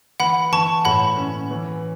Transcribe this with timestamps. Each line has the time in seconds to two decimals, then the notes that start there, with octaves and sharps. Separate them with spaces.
0.20 E3 F#5 B5
0.52 E3 A5 C#6
0.85 A2 F#5 B5
1.18 C#4
1.51 E3